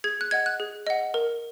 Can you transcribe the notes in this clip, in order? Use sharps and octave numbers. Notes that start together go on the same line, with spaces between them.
G#4 G#6
F#6
D#5 F#5 G#6
F#6
G#4
D#5 F#5
A#4